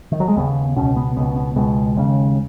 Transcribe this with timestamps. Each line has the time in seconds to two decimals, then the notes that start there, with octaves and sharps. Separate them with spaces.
0.12 D#3
0.20 F#3
0.28 G#3
0.37 D#2 C#3 B3
0.76 C#2 B2 C#4
0.97 B3
1.16 C#2 B2 B3
1.36 B3
1.56 C#2 B2 G#3
1.96 D#2 C#3